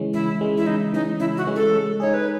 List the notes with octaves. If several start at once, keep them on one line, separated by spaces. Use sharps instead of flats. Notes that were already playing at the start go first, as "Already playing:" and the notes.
Already playing: C#3 E3 G#3 C#4
C#3 E4
E3 G#3 C#4
E4
C#3 D#4
E3 G#3 C#4 D#4
C#3 E4
F#4
E3 G#3 C#4
A4
G#3
D#4 G#4 C#5
B4